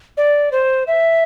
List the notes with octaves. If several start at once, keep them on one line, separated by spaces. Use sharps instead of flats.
D5
C5
E5